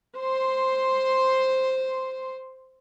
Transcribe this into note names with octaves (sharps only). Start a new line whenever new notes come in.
C5 C6